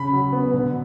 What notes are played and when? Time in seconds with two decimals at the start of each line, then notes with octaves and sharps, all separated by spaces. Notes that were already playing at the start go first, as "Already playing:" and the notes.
Already playing: C#3 B5
0.13 F#3
0.33 B3
0.54 D3